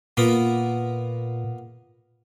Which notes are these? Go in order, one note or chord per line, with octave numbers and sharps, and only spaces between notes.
A#2 A#3 B3 F4